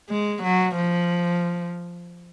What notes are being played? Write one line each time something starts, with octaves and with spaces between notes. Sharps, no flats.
G#3
F#3
F3